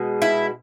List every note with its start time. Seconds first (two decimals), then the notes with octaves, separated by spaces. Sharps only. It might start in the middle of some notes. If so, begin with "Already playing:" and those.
Already playing: B2 G#3
0.22 E4